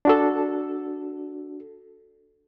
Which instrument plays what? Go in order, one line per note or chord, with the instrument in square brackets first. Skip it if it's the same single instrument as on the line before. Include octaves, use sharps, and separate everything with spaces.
[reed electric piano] D4 F#4 A4